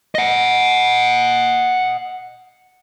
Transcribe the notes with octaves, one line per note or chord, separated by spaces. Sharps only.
D#5 F#5